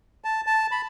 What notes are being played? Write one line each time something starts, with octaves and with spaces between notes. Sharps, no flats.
A5
A5
B5